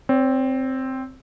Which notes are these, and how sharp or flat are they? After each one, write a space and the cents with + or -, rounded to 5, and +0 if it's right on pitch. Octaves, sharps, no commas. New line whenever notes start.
C4 +0 C#5 +40